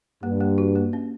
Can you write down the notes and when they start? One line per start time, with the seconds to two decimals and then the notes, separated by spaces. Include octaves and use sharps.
0.23 G2 A#3
0.40 A#3
0.58 F#4
0.76 A#3
0.93 C#4